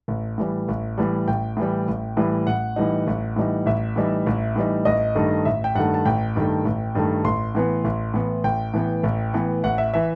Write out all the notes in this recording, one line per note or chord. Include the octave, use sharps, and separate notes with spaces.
A1
A2 E3 G3
A1
A2 E3 G3
A1 G5
A2 E3 G3
A1
A2 E3 G3
A1 F#5
A2 E3 G3 D#4
A1
A2 E3 G3 D#4
A1 E5
A2 E3 G3 D#4
A1
A2 E3 G3 D#4
A1 D#5
G2 D#3 A3
A1 E5
G5
G2 D#3 A3 F#5
A5
A1 G5
G2 D#3 A3
A1
G2 D#3 A3
A1 C6
A2 E3 B3
A1
A2 E3 B3
A1 G5
A2 E3 B3
A1
A2 E3 B3
A1 F#5
E5
E3 E5